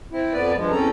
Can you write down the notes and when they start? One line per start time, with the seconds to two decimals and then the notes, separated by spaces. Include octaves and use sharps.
0.12 C4 E4
0.33 F2 B3 B4 D5
0.55 G2 F3 G#3
0.72 E2 C4 C#4 A4 A#5